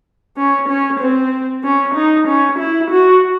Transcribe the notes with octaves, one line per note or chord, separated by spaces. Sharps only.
C#4
C#4
C4
C#4
D#4
C#4
E4
F#4